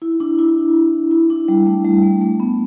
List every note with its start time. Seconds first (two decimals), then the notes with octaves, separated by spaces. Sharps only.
0.02 E4
0.20 D4
0.39 E4
1.11 E4
1.30 D4
1.48 G3
1.67 A3
1.85 G3
2.03 A3
2.21 A3
2.40 B3